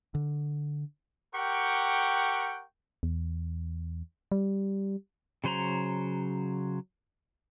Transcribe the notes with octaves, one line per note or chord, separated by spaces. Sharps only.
D3
G4 A#4 F#5 G5 C#6
E2
G3
C#3 F#3 C5 C#5 A#5